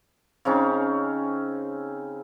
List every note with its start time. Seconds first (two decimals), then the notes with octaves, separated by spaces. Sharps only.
0.45 C#3 C4 C#4 D#4